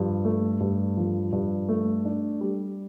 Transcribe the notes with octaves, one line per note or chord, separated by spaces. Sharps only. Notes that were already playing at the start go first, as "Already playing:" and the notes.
Already playing: G2 F3
A3
G2
F3
G2
A3
D4
G3